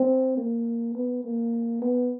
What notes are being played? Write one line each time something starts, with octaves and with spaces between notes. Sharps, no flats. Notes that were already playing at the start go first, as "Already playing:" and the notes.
Already playing: C4
A#3
B3
A#3
B3